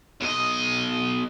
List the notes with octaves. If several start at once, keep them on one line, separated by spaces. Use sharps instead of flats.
B1 D#5